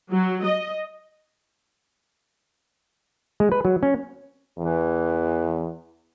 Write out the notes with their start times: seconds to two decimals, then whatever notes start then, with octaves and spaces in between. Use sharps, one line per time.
0.11 F#3
0.44 D#5
3.40 G#3
3.52 B4
3.65 F#3
3.83 C#4
4.59 E2 E3